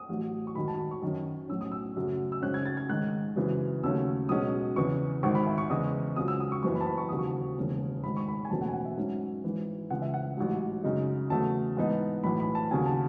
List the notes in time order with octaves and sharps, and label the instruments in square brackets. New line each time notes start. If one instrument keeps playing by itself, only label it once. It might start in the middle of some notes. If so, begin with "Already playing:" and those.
Already playing: [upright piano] D#6
A1 A2 F#3
C#6
G#1 F#2 D#3 F#3 B5
A5
B5
C#6
F#2 D#3 F#3 C#4
B1 A2 F#3 C#4 E6
D#6
E6
F#2 C#3 F#3 A3 C#4
E6
G#1 F#2 C#3 G#3 C#4 F#6
G#6
A6
G#6
G#2 D#3 G#3 F#6
G#1 F#2 C#3 E3
D#2 C#3 F#3 A3 C#4 E6
B1 B2 G#3 C#4 D#6
E2 C#3 E3 C#6
G#1 G#2 D#3 C#6
B5
E5
C#6
E2 C#3 G#3 D#6
C#2 C#3 F#3 D#6
E6
D#6
C#6
F#1 F#2 E3 C#6
B5
A5
B5
C#6
E1 D#2 C#3 F#3 D#6
C#6
E1 D#2 C#3 E3
G#1 G#2 D#3 B5
C#6
B5
G#5
F#1 E2 B2 A3 C#4 A5
F#5
G#5
F#5
E5
G#2 F#3 C#4
G#1 G#2 E3
C#2 C#3 E3 F#5
E5
F#5
A1 G#2 F#3
F#2 C#3 G#3 D#4
E2 C#3 F#3 A3 A5
G#2 E3 B3 D#4
B1 A2 E3 B5
B5
A5
D#2 C#3 F#3 G#5
A5